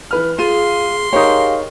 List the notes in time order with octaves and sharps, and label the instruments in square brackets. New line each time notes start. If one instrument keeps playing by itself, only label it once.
[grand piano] E3 B4 F6
[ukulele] F4 [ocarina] G#4 [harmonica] C6 [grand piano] D#7
[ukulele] D#4 C#5 [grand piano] G4 G#4 A#4 [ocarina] F5